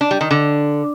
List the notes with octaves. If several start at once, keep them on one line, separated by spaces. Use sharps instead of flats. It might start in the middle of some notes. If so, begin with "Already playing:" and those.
D4
G3
D#3
D3